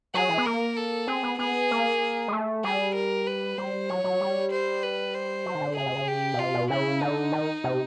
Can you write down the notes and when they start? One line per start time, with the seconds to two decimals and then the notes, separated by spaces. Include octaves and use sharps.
0.14 F#3 G#4
0.29 E3
0.38 B3
0.46 A#3 A#4
0.77 A4
1.07 C4 G#4
1.23 B3
1.39 B3 G#4
1.71 A#3
2.28 G#3
2.33 A3
2.64 G3 G#4
2.95 A#4
3.27 B4
3.58 G3 C5
3.89 F#3 C#5
4.04 F#3
4.21 G3
4.52 C5
4.83 B4
5.14 C5
5.46 F#3
5.55 D#3
5.61 D3
5.77 C#3 G#4
5.86 C3
5.95 C#3
6.08 G4
6.34 B2
6.39 C3 F4
6.54 B2
6.70 C#3 E4
7.01 D3 D#4
7.32 D#3
7.64 C3